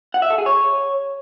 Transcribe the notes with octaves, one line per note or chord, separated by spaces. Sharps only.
F#5
E5
A4
G#4
C#5